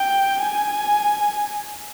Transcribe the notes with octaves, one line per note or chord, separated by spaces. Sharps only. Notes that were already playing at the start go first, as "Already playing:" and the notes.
Already playing: G5
G#5